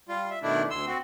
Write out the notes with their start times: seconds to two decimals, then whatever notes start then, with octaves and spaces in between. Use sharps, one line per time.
0.09 G3 F4
0.30 E5
0.42 B2 D#3 A3 D4 E4
0.70 D2 C6 E6
0.87 C4 F#4